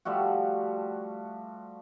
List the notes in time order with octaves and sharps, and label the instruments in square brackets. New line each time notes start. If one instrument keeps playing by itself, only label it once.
[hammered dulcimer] F3 G3 A3 F#4